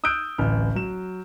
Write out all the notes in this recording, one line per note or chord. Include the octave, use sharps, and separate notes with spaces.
D#6 E6 F#6 G6 D7
D1 A1 F6
F#3 E7